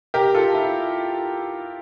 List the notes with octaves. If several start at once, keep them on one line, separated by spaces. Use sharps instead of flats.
G4 A#4
F4 A4
E4